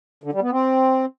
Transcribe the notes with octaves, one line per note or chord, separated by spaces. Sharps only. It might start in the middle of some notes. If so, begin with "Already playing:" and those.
D3
G3
B3
C4